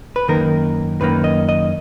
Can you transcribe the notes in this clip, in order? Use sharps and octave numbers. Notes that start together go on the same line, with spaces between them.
B4
F#2 D#3 A#3 A#4
F#2 D#3 A#3 B4
D#5
D#5